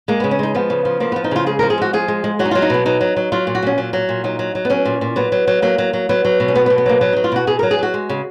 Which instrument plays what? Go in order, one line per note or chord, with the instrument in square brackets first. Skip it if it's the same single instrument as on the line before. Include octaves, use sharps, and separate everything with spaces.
[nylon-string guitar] G#3 A#3
C#3 B3
C#4
G#3 D#4
F3 B3
C#3
F3
F3 A#3
F3 B3
D#4
C#3 F4
G#3 G#4
F3 A#4
G#4
G#3 F#4
F3 G#4
G#3
G#3
F#3 F#4
D#4
F#3 F4
D#4
B2 B3
F#3 D#4
F#3
F#3
F#3 F4
A#2
F#4
A#2 C#4
F#3
F#3
A#2
F#3 D#4
F#3
F#3
B3
F#3 C#4
A#2
A#2
F#3 B3
F#3
F#3
F#3 A#3
F#3
F#3
F#3 B3
F#3
B2
C#4
F#3 B3
B3
B2
B3
F#3 A#3
F#3 B3
F#3 D#4
F4
B2 F#4
B2 G#4
F#3 A#4
G#4
F#3 F#4
G#3
C#3